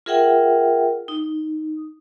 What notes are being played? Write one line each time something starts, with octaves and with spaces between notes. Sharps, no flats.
F4 G#4 A#4 E5 F#5 G5
D#4